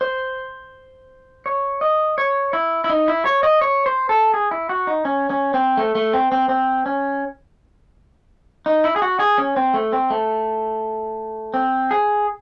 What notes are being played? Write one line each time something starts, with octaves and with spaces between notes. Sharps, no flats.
C5
C#5
D#5
C#5
E4
E4
D#4
E4
C#5
D#5
C#5
C5
A4
G#4
E4
F#4
D#4
C#4
C#4
C4
A3
A3
C4
C4
C4
C#4
D#4
E4
G#4
F#4
G#4
C#4
C4
A3
C4
A3
C4
G#4